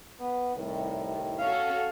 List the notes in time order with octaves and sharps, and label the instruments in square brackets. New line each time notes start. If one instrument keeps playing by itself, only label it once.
[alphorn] B3
[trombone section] C2 D#3 [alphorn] A2
[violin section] C#4 F#4 A4 [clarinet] F5